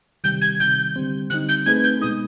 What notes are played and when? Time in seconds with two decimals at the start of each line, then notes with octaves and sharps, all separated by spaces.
0.24 C3 D#3 G3 G6
0.41 G#6
0.59 C3 D#3 G3 G6
0.96 D3 G3 C4
1.30 D3 G3 C4 D#4 F#6
1.49 G6
1.66 A3 C4 D#4 G#4 B4 G#6
1.84 G6
2.01 B2 G#3 B3 D#4 D#6